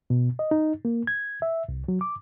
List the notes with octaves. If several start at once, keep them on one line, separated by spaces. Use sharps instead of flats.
B2
D#5
D#4
A#3
G#6
E5
C2
F#3
D6